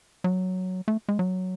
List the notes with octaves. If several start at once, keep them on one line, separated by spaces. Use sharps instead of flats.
F#3
A3
G#3
F#3